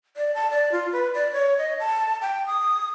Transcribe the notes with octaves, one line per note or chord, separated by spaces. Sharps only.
D5
A5
D5
F4
B4
D5
C#5
D#5
A5
G5
D#6